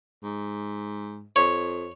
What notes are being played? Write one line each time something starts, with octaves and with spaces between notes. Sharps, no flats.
G#2
F2 C#5